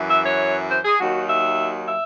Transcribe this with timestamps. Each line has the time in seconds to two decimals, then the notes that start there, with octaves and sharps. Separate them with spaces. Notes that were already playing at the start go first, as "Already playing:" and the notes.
Already playing: F#2 E3
0.11 E5
0.26 C#5
0.71 C5
0.85 G#4
1.00 D#2 D#3 F#3 F#4
1.30 E5
1.89 E5